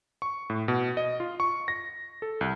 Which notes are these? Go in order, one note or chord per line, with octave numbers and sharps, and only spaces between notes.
C#6
A2
B2
D#5
F4
C#6
A#6
A4
C2